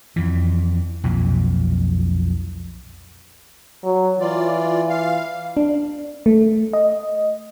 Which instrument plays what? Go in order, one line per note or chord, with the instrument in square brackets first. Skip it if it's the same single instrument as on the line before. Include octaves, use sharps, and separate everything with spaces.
[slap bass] F2 E3
B1 F2 A#2
[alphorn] F#3
[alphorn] E3 [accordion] F4 D5
[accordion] F5
[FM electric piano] D4
A3
D#5